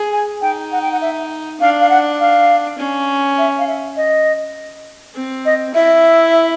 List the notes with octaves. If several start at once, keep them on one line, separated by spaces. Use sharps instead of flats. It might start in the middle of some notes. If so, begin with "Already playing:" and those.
Already playing: G#4
G#5
D#4 G5
F#5
G5
F#5
E5
D4 F5
F5
F#5
F5
C#4
E5
F5
E5
D#5
C4
D#5
E4 E5